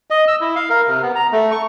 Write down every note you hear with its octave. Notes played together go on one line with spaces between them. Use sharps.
D#5
E6
E4
F5
A#4
C3
B3
A#5
A3
C#6